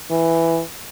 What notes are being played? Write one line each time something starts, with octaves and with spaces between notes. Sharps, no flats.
E3